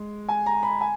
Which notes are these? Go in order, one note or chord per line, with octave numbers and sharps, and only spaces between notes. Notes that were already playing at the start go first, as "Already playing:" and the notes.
Already playing: G#3
G#5
A#5
B5
G#5